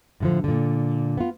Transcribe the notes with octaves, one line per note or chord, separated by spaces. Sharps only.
A2 D3 F3
A#2 D3
B3 F4